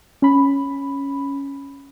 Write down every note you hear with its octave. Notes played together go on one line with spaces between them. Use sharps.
C#4 B5